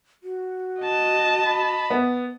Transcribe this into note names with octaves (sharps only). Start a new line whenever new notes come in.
F#4
D#5 A5
B5
B3